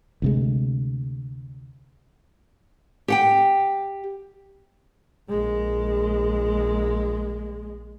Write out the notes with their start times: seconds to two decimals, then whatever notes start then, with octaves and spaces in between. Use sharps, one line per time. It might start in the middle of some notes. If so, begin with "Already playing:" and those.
0.22 D2 C3 G#3
3.08 G4 F#5 G5
5.29 A#1 G#3